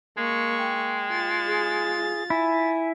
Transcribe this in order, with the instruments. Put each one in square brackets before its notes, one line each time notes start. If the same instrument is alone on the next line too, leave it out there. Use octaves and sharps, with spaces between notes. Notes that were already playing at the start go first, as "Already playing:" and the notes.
[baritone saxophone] G#3 [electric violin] A#3 C#6
[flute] G5
[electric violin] F4 A6
[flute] G#4
[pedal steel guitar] E4 [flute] G#5